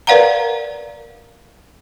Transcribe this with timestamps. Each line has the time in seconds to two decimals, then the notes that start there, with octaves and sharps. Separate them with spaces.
0.07 A#4 B4 D5 F5 F#5 A#5